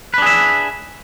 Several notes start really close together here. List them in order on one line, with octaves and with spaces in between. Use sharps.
B4 D4 G#4 E5